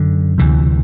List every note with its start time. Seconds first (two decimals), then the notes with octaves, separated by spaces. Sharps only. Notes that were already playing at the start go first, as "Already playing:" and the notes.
Already playing: F#2 D3
0.38 D2 C3 E3